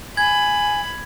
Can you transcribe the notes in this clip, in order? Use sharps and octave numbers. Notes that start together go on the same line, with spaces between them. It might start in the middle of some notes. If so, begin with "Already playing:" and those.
G#5 B5 G#6